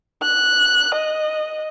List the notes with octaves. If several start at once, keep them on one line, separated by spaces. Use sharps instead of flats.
F#6
D#5